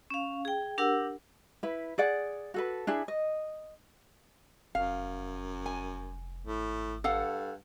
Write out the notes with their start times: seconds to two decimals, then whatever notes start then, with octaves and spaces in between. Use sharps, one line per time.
0.10 C#4 F5
0.45 G#4 G5
0.78 D4 G4 A#4 F#5 E6
1.63 E4 B4
1.98 G#4 D5 F#5
2.54 F#4 A4 B4
2.87 D4 E4 G#4
3.08 D#5
4.75 F1 F#2 F5
5.66 G#5
6.46 G#1 A2
7.04 G2 A4 F5 F#5